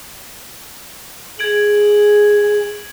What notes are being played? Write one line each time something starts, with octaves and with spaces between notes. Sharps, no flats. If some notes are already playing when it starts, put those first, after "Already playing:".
G#4 G#6 D7 F#7